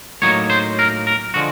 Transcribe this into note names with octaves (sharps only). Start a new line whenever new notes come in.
A2 F#3 A#3 D#4 C#5
C5
A#4
A#4
D3 F3 G#3 F#4